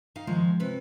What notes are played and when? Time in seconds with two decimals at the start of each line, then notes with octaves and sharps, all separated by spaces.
0.16 D#4 F5
0.27 D#3 F3 G#3
0.60 C3 B4